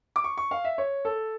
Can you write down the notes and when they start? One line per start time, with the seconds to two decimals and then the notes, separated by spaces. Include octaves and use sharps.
0.16 D6
0.24 C#6
0.38 C#6
0.51 F5
0.65 E5
0.78 C#5
1.05 A4